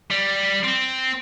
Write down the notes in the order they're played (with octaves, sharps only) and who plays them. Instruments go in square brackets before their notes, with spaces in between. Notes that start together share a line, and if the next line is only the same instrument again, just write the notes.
[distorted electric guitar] G3
C4